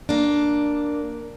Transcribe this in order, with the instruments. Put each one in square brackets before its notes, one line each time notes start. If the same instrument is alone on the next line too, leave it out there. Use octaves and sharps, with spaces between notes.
[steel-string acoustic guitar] A#3 D4